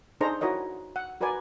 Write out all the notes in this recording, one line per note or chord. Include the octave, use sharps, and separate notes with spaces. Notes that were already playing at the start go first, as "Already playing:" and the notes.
D4 D#4 G#4 A4 C5 A#5
E4 F#4 A#4 C#5 D#5
F#5
F#4 A#4 B4 D5 G#5